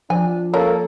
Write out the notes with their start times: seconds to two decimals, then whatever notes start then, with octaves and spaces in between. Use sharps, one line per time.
0.10 F3 D4 G#5
0.54 A#3 C#4 A4 A#4